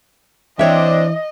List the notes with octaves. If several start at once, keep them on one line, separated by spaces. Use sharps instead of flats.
E3 C4 D4 C#5 D#5 E5